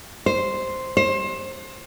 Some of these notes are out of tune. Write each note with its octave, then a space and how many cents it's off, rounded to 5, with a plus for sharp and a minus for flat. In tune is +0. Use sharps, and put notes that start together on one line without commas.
C5 +0
C5 +25